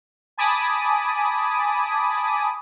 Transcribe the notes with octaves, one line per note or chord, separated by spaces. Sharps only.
G#5 A5 B5 D6 D#6